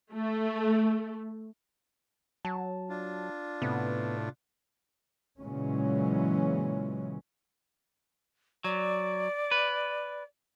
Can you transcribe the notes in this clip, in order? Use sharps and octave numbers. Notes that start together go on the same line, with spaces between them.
A3
F#3 A5
D4 F4
A2 C3 B3
A#2 C#3 E3 F#3 G#3 C#4
F#3 D5
B4